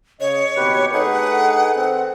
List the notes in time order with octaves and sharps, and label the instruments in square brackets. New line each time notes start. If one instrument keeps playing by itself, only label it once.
[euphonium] C#3 [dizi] C#5 [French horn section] D#5
[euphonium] B2 [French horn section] D#3 A#3 C4 [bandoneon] G4 B4
[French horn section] A3 D4 B4 [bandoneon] D#4 G#4 [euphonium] A4 [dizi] F#5
[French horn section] D#3 C5 [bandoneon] C4